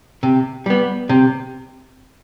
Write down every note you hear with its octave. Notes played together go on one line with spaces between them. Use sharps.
C3
G3 B3
C3